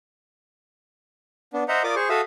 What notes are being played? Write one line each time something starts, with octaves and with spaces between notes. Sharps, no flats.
B3 D4
C5 D#5 E5 F#5 A#5
F4 A#4 D5 D6 D#6
G#4 C5 C#6
F#4 A4 E5 F5 D#6 E6